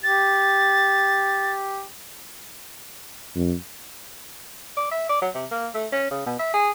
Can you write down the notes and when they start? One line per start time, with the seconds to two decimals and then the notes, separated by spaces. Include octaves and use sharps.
0.03 G4 A6
3.35 F2
4.77 D5
4.91 E5
5.09 D5
5.22 F#3
5.34 C3
5.51 A#3
5.74 A3
5.92 C#4
6.11 C#3
6.26 B2
6.39 E5
6.53 G#4